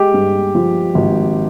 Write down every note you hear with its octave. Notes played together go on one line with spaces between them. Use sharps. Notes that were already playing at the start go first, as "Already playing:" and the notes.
Already playing: G#3 G4
G2
F3
G#1